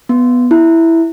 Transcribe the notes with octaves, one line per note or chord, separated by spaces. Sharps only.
B3
E4